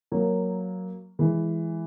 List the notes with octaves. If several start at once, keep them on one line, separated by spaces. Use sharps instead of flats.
F#3 A#3
E3 G#3